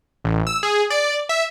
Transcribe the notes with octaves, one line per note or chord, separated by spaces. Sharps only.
A1
E6
G#4
D5
E5